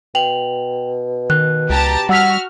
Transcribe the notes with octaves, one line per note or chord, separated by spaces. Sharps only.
B2 G5 F7 F#7
D#3 F#6
C#2 G4 A5 A#5
G3 F#4 F#5 E6 F6 B6